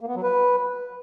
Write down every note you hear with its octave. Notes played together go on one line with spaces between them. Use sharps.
A#3
B3
F#3
B4